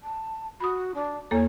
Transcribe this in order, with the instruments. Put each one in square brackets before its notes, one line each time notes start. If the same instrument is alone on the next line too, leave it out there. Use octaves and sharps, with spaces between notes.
[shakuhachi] A5
[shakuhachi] F#4 [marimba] B5 D#6
[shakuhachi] D4
[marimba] E2 A#3 A4 [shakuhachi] C#5